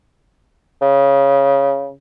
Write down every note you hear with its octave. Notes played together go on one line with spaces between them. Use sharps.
C#3